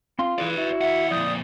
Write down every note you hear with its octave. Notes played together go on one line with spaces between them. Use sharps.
C4 F4 C6
E3 G#4 B4 D5
E4 F#4
D#2 E5 F#5
F2 A#2 D5 D#6 G6